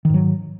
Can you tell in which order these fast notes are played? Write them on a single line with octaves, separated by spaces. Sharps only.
D#3 G#2 F#3